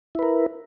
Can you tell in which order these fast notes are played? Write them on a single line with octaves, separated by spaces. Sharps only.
E4 B4 A#4